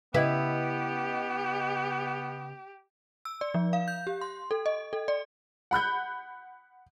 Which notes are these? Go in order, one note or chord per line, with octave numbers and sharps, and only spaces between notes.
C#3 B3 E4 G4 B4 D#5
E6
D5
F3
F5
G6
G4
C6
A4
D#5
A4
D5
F#5 B5 F#6 G6